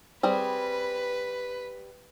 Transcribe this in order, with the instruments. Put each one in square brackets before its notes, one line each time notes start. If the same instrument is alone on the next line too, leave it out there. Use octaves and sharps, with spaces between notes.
[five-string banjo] G3 C4 G#4 [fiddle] B4